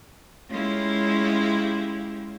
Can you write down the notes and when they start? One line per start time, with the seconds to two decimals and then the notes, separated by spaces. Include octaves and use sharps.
0.49 G#3 C#4 E4 F4 G4